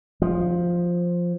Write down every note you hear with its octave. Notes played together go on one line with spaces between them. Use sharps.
F3